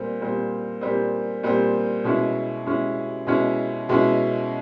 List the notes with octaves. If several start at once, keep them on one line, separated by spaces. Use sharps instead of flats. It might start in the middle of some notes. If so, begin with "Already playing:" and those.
Already playing: A#2 G3 C4
A#2 G3 C4
A#2 G3 C4
A#2 G3 C4
B2 G#3 C#4 E4
B2 G#3 C#4 E4
B2 G#3 C#4 E4
B2 G#3 C#4 E4